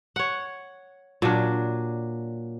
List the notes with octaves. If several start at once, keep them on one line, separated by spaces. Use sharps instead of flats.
C#5 F#5
A#2 F#3 D4